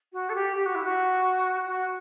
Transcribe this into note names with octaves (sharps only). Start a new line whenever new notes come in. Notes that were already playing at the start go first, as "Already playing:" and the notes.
F#4
A4
G4
G4
F#4
E4
F#4
F#4